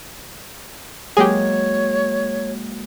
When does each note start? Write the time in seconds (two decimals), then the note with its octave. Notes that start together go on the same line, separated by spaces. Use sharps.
1.17 F#3 G#3 A#3 G4 G#4 C#5